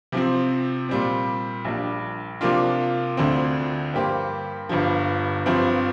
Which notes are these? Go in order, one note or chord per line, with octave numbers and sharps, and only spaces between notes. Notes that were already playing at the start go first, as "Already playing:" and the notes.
C3 F3 C4
A#2 G3 C4
A#1 A#2 G3 D4
C3 F3 A#3 D4 F4
D2 D3 F3 C4
G2 G3 A#3 G4 C5
G1 G2 F3
G1 G2 F3 C4